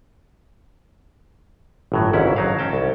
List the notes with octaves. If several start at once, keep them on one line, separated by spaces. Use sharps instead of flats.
G1 A2 F#3
G#1 C#2 G#2 C#4 E4 F#5
F#3 D#4 F5
C#4 G5 A5
C2